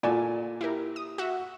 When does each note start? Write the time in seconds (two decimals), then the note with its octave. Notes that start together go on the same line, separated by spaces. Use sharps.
0.03 A#2 F#4 A4 D5 G#5
0.61 E4 G4 A#4
0.96 D#6
1.18 F#4 E5